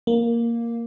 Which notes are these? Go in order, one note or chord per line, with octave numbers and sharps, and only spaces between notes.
A#3